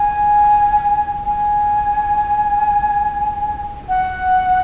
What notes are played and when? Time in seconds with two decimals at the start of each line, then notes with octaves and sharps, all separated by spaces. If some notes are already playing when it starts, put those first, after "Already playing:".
Already playing: G#5
1.26 G#5
3.89 F#5